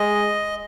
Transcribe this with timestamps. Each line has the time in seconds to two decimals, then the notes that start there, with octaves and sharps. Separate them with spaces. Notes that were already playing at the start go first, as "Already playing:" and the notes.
Already playing: G#3 D#5